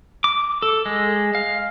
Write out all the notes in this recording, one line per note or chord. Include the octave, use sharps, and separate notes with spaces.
D6
A4
G#3
F5